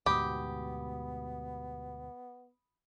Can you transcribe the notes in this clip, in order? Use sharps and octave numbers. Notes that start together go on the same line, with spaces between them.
D2 G#2 B2 B3 G4 B5 D#6